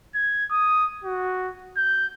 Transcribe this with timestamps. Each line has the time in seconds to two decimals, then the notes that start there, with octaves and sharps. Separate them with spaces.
0.15 G#6
0.51 D#6
1.04 F#4
1.77 G6